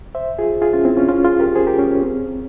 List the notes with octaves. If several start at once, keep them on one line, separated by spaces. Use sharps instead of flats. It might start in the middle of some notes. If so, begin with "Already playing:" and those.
C5 E5
F4 G#4
F4 G#4
C#4 F4
C4 E4
C#4 F4
C#4 F4
F4 G#4
G4 A#4
G#4 C5
G4 A#4
C#4
C#4
C4